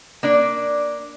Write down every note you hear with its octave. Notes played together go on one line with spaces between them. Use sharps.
A#3 D4 D5